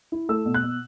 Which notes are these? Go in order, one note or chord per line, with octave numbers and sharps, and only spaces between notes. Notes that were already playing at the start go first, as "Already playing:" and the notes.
E4
A3 E6
B2
F#6
B2